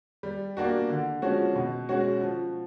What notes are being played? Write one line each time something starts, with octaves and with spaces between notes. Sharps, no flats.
G3
A#3 D4 F#4
D3
F3 G#3 C#4 F#4
B2
G#3 C#4 F#4
F3